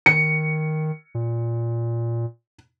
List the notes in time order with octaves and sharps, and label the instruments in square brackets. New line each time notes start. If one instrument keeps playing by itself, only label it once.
[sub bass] D#3 [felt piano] C#7
[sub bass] A#2